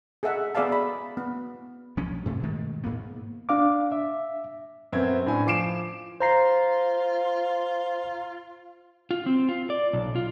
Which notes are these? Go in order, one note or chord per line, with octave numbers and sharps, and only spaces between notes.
G#4 A4 D#5 E5 F#5
B3 G#4 D5 E5 F5 A5
B5
B3
B1 F3 F#3 C#4
G2 C3 A3
B2 D#3 G#3 A3
G#2 A#3 B3
D4 F5 D6
E5
F#2 B3 C4 E5 G#6
A2 D4 G#5
F3 D6 C7 D7 E7
F4 C5 A#5 C7
F4
C4
F4
D5
B1
F4